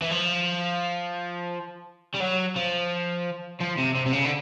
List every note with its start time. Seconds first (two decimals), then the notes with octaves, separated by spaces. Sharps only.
0.02 E3
0.11 F3
2.15 G3
2.21 F#3
2.56 F3
3.60 F3
3.78 C3
3.95 C3
4.06 C3
4.13 C#3
4.25 D3